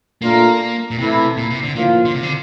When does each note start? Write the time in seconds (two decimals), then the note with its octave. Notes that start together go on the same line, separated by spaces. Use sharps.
0.22 A#2 A3 A#3 D4 F4 A#4
0.91 A#2
0.98 A2 C3 E3 A3 E4
1.37 A#2
1.50 C3
1.63 D3
1.76 A2 D3 F3 A#3 F4
2.05 D3
2.14 C3
2.23 D3